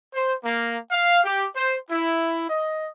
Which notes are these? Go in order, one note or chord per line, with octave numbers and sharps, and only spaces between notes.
C5
A#3
F5
G4
C5
E4
D#5